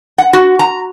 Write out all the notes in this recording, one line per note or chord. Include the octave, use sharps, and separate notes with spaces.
F#5
F#4
A#5